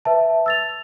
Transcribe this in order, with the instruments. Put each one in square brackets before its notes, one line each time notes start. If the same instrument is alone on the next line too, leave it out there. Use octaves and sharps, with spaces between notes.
[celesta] B4 E5 A5
E6 A6 F7